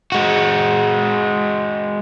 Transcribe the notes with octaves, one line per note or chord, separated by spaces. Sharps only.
G#3 F#4